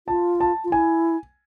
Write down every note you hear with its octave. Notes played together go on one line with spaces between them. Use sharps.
F4 A5
A5
F4
E4 G#5